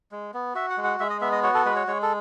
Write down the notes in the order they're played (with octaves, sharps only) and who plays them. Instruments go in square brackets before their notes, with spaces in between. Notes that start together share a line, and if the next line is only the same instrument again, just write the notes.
[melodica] G#3
B3
F#4 E5
F#5
G#3
F#5
G#3 E5
D#5
B3 E5
D#5
F#4 C#5
A4
G#3 B4
C#5
G#3 C#5
A4